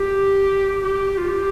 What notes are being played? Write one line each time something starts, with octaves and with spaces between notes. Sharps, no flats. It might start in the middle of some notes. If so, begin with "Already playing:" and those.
Already playing: G4
G4
F4
G4